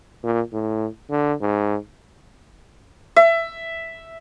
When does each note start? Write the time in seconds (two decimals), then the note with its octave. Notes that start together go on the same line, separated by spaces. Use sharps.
0.24 A#2
0.53 A2
1.10 D3
1.42 G#2
3.16 E5